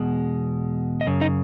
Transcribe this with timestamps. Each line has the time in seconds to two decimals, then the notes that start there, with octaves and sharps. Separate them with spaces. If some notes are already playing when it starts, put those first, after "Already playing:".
Already playing: E2 B2 G#3
1.01 D#5
1.06 F#2 C#3
1.21 D#4 D#5